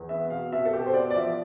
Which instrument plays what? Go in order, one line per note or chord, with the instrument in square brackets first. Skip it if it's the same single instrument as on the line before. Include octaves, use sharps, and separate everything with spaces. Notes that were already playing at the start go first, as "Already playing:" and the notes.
Already playing: [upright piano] E2
B3 E5
B2 F5
B2 E5
A4
B2 G4
C5
B3 D5
D5
F3 E5